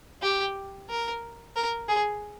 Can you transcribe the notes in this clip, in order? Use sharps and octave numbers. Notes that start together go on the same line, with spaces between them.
G4
A#4
A#4
G#4